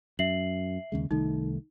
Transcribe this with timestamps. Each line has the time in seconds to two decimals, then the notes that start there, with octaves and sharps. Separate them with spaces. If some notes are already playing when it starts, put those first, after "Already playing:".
0.19 F#2 E5 C7 F#7
0.92 D#2 C#3 G#3
1.11 C2 D#3 A3 D#4